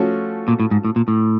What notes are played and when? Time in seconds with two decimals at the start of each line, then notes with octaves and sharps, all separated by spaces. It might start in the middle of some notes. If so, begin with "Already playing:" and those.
Already playing: F3 A3 C#4 F#4
0.48 A#2
0.60 A2
0.71 G#2
0.85 A2
0.96 A#2
1.08 A2